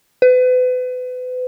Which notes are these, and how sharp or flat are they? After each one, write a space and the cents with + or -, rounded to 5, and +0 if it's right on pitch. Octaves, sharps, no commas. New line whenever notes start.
B4 +35